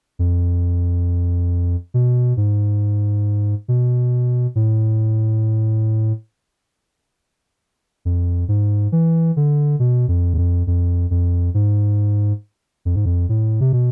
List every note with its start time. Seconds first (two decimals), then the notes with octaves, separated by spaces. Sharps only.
0.19 F2
1.94 B2
2.37 G#2
3.68 B2
4.55 A2
8.05 F2
8.48 G#2
8.92 E3
9.36 D3
9.79 B2
10.08 F2
10.34 E2
10.38 F2
10.67 F2
11.10 F2
11.54 G#2
12.85 F2
12.96 G#2
13.06 F2
13.29 A2
13.61 C3
13.73 B2